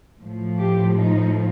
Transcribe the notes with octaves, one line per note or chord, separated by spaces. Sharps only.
A2 F3
G4
D#4